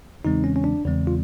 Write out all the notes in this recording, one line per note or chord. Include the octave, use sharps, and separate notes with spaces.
E2 C#3 E3 G#3 C4 D#4
C#4
C#4
D4
E2 C#3 E3 G#3 C4
F4